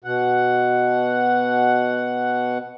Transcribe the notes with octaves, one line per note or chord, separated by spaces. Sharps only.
B2 F#5